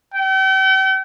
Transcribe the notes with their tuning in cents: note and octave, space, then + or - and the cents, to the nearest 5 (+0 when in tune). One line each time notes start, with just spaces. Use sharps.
G5 -40